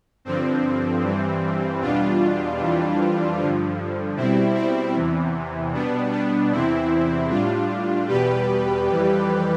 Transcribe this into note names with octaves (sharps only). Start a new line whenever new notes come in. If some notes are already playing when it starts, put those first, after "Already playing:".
G2 D3 F3 C4
G2 E3 G3
E2 B2 G3 D4 F4
F2 E3 G3
G2 D3 F3
B2 G3 C4 E4
C4 E4
E2 C3 E3
B2 G3 B3 D4
B3 D4
E2 C3 E3 C4 E4
A2 G3 D4 F4
E2 B2 G3 G4 B4
F2 E3 G3